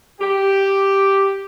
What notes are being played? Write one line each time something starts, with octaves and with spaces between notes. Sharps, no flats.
G4